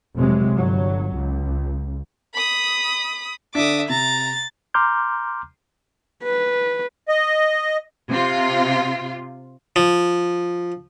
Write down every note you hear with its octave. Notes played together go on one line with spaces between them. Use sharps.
F1 C3 F#3 G#3
G1 F#3
C#2
B5 D#6
D3 D4 E5 D6 D#6
C3 A#5 A6
A#5 C6 D6 F6 G6
B4
D#5
C3 F4
F3